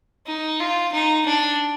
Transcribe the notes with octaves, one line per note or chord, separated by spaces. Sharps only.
D#4
F4
D#4
D4